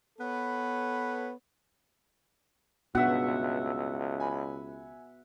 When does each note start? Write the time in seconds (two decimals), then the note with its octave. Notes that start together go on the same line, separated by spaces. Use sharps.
0.19 B3 A4 B4 C#5
2.95 C#2 G2 B2 B3 F#4 E5 F#5
4.20 G#5 B5